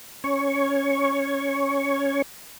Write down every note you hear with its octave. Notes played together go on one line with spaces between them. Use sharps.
C#4 C#5 C#6